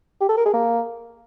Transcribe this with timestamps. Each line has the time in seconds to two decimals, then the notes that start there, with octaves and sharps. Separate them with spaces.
0.21 G4
0.29 A4
0.37 A#4
0.45 G#4
0.54 A#3